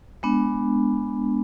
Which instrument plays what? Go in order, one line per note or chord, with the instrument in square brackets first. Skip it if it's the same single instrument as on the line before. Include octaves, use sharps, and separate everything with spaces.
[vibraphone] G#3 B3 D4